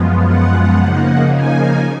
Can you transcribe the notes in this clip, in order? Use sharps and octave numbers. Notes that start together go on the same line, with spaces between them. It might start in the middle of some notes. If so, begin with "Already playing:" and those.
Already playing: F#2 F3 G#3 B3 F4
F#5
C#3 F3 A#3 D#4
G#5